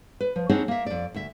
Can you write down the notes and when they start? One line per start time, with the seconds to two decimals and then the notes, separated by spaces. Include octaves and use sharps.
0.20 B4
0.36 F3
0.49 C4 D4 D#4 G#4 C#5 F#5
0.68 A#3 E5
0.86 F2 D5
1.14 D2 E5